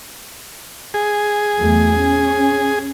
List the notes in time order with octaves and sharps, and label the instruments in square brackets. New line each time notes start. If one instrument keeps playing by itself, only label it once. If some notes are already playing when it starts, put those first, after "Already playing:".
[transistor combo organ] G#4
[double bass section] E2 F#3 A3
C#4